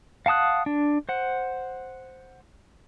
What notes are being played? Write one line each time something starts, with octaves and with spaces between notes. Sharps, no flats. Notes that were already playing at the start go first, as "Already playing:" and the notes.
F5 F#5 A5 D#6 F#6
D4
C5 F#5